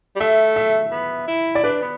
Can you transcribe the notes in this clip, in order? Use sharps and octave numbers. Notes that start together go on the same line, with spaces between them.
G3
A3 E5
E5
B3
E4
D5
D4 B4
B3